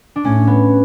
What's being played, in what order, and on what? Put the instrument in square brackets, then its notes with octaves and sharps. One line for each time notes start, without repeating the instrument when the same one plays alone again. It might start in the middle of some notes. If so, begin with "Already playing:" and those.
[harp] D4
[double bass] A2 [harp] C#4
[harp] B3